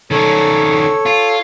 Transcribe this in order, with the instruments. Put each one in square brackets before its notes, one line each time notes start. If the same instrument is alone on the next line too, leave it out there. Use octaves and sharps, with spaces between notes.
[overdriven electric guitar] D#3 C#4 [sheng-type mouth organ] A4 C#5
[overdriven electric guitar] F4